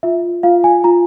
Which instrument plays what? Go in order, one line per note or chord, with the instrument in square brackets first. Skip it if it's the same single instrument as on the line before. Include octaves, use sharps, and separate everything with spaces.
[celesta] F4 E5
F4 F5
G#5
F4 A#5